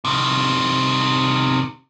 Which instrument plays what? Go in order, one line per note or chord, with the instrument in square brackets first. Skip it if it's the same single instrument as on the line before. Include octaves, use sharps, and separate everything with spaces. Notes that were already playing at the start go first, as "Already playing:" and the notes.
[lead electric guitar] C3 D#3